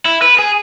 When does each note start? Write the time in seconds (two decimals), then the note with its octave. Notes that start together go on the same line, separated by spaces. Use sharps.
0.05 E4
0.22 B4
0.39 G#4